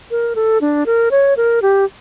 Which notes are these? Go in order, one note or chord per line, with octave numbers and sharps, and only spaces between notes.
A#4
A4
D4
A#4
C#5
A#4
G4